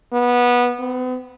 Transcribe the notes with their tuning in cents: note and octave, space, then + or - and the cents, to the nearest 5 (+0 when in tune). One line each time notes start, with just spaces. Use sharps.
B3 -15
B3 +45